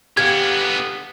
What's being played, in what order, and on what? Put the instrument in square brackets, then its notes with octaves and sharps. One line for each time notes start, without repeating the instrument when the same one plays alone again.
[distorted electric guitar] D3 B3 [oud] G4 F5 [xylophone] G#6